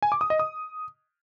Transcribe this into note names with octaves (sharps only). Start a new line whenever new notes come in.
G#5
D6
D#6
D#5
D#6